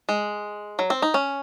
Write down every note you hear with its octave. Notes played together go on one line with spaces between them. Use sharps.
G#3
F#3
C4
D#4
C#4